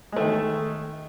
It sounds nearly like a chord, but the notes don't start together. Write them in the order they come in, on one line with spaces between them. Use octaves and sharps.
G#3 A3 D#3